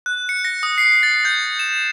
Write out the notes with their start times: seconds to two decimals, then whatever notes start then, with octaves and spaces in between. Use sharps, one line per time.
0.06 F#6
0.29 C#7
0.45 A#6
0.63 D#6
0.78 C7
1.03 A6
1.25 G6
1.59 E7